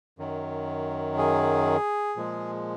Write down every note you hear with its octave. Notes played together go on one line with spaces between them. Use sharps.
F#2 D#3 F#3
G#4
A#2 F3 G#3